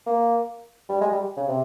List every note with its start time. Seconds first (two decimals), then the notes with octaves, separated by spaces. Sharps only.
0.06 A#3
0.89 G3
1.01 G#3
1.12 G3
1.37 C#3
1.48 C3